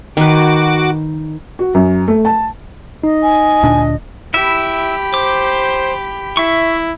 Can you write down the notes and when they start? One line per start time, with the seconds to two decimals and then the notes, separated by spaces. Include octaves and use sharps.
0.17 D#3 F#4 B4 D6
1.59 F#4
1.74 F#2
2.08 A3
2.25 A5
3.04 D#4 D#5
3.23 G#5
3.63 D2 A#2 D4
4.34 E4 G4 E5 B5
5.14 C5 D6
6.37 E4 E5 C#6